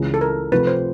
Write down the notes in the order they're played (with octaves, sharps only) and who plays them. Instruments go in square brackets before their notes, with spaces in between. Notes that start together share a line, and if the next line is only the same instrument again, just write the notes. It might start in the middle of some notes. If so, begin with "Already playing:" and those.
Already playing: [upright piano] C#2 C#3 E3
[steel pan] A4
A#4
[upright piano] C3 F3 A3 [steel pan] B4
[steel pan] C5